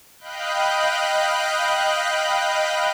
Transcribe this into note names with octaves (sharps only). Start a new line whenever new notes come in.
D#5 F5 G5 B5 F#6 G6